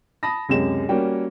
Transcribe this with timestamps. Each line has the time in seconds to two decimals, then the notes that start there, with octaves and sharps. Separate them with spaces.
0.23 A5 B5 D#6 A#6
0.49 C#2 F#2 C3 G#3 G4 E7
0.89 G3 A#3 C#4 F#4 C#5 G5